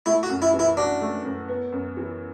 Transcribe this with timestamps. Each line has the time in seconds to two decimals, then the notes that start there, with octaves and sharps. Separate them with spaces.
0.06 A3 E4
0.23 F#4
0.30 F#2
0.42 E4
0.54 E3
0.59 E4
0.77 D4 F#4
1.01 A3
1.24 F#2
1.48 B3
1.72 F#2
1.97 E3